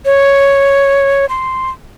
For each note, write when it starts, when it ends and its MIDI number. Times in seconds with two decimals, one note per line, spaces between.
0.05 1.26 73
1.29 1.70 84